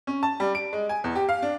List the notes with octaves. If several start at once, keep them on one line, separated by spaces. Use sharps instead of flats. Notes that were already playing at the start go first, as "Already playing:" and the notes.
C#4
A5
G3
D7
G#3
G#5
E2
G4
F5
D4